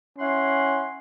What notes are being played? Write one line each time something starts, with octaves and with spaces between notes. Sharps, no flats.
C#4 E4 F#5 C6